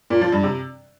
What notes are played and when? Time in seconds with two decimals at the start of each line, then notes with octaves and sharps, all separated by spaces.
0.10 A#2
0.21 F3
0.32 G2
0.43 C3